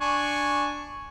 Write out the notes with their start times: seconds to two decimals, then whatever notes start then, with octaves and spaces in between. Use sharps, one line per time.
0.01 D4 G#5 C#6